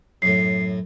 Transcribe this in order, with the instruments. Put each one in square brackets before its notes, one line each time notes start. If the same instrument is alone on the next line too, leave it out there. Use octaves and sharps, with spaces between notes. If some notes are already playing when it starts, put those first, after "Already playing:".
[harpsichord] F#2 A2 [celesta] C7